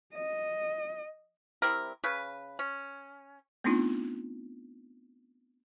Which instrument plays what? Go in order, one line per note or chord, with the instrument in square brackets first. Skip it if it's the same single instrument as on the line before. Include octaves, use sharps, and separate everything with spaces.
[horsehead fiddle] D#5
[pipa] G3 C4 E4 A#4
C#3 B4
C#4
[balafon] A3 B3 C4 D4 D#4 F4